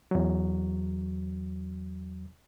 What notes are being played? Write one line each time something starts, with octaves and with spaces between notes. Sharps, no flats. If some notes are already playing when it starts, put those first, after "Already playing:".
E2 F#3